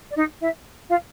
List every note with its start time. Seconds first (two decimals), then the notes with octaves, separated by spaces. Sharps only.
0.09 D5
0.16 D#4 D#5
0.40 E4 E5
0.88 F4 F5